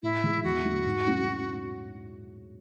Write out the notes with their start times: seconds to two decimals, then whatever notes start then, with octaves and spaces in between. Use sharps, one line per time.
0.03 A2 E4
0.24 E3 G#3
0.44 E2 F#4
0.65 D3 F#3 A3
0.85 G#2
1.06 F#3 A3 C#4 E4